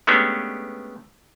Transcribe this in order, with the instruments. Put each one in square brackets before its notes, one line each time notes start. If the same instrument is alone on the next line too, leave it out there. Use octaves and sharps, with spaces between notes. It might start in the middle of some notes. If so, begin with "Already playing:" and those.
[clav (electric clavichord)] G#3 A3 B3 C#4 D4 G4